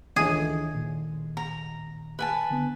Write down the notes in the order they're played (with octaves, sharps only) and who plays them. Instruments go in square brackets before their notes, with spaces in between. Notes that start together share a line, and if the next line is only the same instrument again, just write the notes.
[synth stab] C#2 A2 G#3 [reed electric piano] D#3 E3 D4 [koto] G#4
[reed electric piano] A#2 D#3
[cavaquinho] A#5
B4 G#5 A5
[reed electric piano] D3 B3